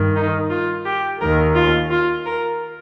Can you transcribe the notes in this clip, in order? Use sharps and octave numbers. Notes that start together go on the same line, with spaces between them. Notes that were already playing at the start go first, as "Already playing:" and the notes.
Already playing: G2 D#3
D#4
F4
G4
D#2 D#3 A#4
F4
F4
A#4